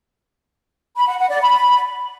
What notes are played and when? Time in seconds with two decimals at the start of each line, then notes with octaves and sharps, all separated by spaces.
0.97 B5
1.08 F#5
1.19 F#5
1.30 D5
1.41 B5